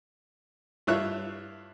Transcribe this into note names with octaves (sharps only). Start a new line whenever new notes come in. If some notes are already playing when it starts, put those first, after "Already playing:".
G2 E4 F4 C#5 E5 F#6